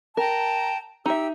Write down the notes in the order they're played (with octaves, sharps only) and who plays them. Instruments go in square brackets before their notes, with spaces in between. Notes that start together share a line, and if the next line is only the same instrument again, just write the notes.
[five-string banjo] A#4 [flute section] G5 A5 A#5
[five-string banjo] D#4 E5 [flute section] G4 E6